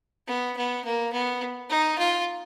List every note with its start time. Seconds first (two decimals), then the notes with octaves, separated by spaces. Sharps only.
0.28 B3
0.57 B3
0.85 A#3
1.13 B3
1.70 D#4
1.98 F4